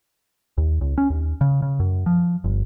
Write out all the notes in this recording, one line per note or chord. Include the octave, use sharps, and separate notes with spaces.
D#2
C#2
C#4
D#2
C#3
C#3
F#2
F3
G1